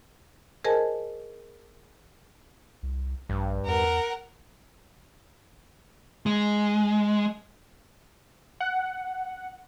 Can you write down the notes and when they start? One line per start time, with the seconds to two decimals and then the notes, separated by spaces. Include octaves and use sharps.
0.64 G#4 A#4 C5 D#5 G#5 A5
2.83 C2
3.29 A#1 G2
3.66 E2 A#4 F#5
6.26 G#3
8.60 F#5